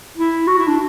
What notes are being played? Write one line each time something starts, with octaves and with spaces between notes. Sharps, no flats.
E4
F#4
E4
D4